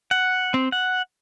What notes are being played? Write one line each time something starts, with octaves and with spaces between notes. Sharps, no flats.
F#5
C4
F#5